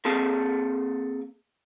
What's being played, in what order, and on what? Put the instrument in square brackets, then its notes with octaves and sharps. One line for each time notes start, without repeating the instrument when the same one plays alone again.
[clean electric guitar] A#3 C4 G#4 A4 F5 A5